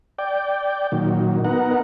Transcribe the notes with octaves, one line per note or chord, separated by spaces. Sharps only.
D5 G5
A#2 D#3 F#3
B3 D#4 A#4 F#5